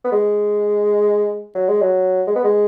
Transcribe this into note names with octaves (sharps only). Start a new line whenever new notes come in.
B3
G#3
F#3
G#3
F#3
G#3
B3
G#3